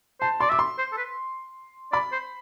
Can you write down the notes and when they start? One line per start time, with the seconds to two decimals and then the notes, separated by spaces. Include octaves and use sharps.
0.21 C5 A5
0.40 D5 C6
0.50 E5 D6
0.59 C6
0.78 C5
0.92 A4
0.97 B4
1.92 D5 B5
2.12 C5